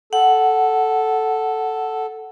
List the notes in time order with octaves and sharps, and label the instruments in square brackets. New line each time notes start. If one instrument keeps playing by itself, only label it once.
[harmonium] A4 [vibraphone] F#5